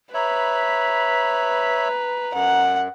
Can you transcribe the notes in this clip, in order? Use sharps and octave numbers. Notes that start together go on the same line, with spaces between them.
B4 C#5 E5 A#5 B5
F#2 F#5